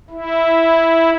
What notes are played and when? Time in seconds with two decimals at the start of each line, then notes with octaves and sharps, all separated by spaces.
0.10 E4